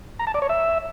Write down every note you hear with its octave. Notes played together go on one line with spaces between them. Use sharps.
A#5
A5
D5
C#5
E5